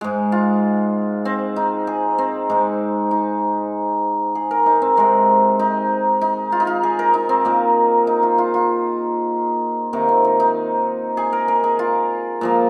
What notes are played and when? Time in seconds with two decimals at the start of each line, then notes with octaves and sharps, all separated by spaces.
0.01 G#2 G#3 G#4
0.32 F4
1.25 C4
1.56 D#4
1.87 G#4
2.18 C4
2.50 G#2 G#3 D#4
3.11 D#4
4.35 G#4
4.51 A#4
4.66 D#4
4.82 C4
4.97 C3 G#3 C4
5.59 D#4
6.21 D#4
6.52 F4
6.60 D#4
6.67 F4
6.83 G#4
6.99 A#4
7.14 D#4
7.29 C4
7.45 A#2 A#3
8.07 D#4
8.23 F4
8.38 F4
8.54 F4
9.93 C3 D#3 A#3 D#4
10.09 C4
10.24 D#4
10.40 D#4
11.17 G#4
11.33 A#4
11.48 A#4
11.64 G#4
11.79 F4
12.41 A#2 F3 A#3